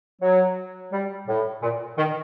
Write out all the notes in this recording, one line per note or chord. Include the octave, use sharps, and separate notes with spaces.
F#3
G3
A2
A#2
D#3